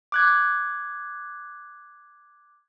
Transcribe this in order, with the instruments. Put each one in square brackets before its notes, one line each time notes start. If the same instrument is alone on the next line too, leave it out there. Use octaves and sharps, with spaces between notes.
[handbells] D6 F#6 G#6